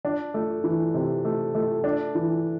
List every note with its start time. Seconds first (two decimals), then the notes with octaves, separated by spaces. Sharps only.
0.05 D4
0.34 A3
0.64 E3
0.94 C3
1.25 A3
1.55 A3
1.84 D4
2.15 E3